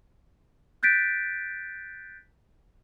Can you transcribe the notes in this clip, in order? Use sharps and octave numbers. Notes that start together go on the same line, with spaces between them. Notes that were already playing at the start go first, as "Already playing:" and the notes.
F#6 G6 A6 B6 D7